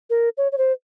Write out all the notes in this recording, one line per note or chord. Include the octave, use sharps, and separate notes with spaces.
A#4
C#5
C#5
C5